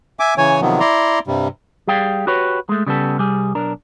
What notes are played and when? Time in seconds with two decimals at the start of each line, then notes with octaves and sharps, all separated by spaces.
0.20 E5 G#5 D6
0.38 C#3 E3 C#5 G#5
0.61 C3 D#3 F3 F#3 B3
0.80 E4 D5 A#5 C6
1.27 G2 C3 G3
1.87 G3 G#4 F5 G5
2.27 F#4 G4 B4 C#5
2.69 G#3 A3
2.86 C#3 G3 B3 A4
3.18 C2 G3 G#4
3.55 B1 D4 A#4